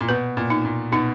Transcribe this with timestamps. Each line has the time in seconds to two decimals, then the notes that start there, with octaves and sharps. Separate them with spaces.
0.01 A#2
0.09 B2 B4
0.37 A#2
0.50 D#4
0.65 A#2
0.92 B2 D#4